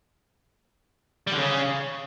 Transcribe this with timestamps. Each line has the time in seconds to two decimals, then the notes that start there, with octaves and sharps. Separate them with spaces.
1.27 G3
1.32 D3
1.37 C#3